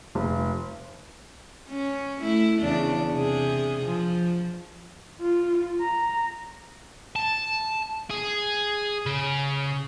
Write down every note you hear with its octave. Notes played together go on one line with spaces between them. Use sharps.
F1
C#4
A3 E4
E2 C#3 D4
C3 G#4
F3
F4
A#5
A5
G#4
C#3